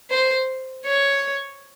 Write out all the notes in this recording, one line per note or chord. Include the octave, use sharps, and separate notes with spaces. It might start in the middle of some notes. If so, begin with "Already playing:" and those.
C5
C#5